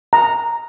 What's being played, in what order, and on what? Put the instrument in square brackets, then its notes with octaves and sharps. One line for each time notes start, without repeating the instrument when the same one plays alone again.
[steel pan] A#5